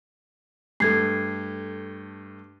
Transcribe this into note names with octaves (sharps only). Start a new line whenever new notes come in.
G2 A3 A4 G#6 C7